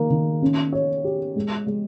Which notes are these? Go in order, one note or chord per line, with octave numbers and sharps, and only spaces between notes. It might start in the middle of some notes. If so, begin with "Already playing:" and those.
Already playing: D#3 A#3
D#3
C#4
C#5
G4
G#3
G#3